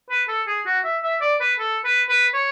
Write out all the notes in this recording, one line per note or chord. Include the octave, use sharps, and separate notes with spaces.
B4
A4
G#4
F#4
E5
E5
D5
B4
A4
B4
B4
C#5